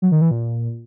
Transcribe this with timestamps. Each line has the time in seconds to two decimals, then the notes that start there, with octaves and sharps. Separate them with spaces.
0.02 F#3
0.12 D#3
0.21 E3
0.31 A#2